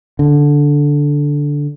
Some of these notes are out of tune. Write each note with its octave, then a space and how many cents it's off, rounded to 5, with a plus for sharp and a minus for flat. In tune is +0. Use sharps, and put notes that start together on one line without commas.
D3 -10